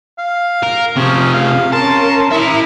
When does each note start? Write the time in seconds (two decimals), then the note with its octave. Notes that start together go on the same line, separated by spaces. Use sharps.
0.18 F5
0.63 A#4
0.96 C3 F3 C#4 G#4
1.34 F5
1.72 C#4 A#4 A5 C6
2.31 E4 E5 A#5